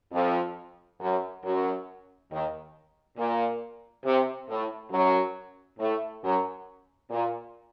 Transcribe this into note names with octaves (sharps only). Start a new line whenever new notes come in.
F2 F3
F#2 F#3
F#2 F#3
D#2 D#3
A#2
C3
A2
F#2 F#3
A2 A3
F#2 F#3
A#2